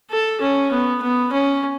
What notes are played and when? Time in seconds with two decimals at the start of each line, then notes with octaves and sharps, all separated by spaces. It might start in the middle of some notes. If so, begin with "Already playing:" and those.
0.11 A4
0.41 C#4
0.72 B3
1.02 B3
1.32 C#4